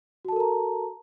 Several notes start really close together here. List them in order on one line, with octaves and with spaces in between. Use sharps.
F#4 A5 A4 A#4 A#5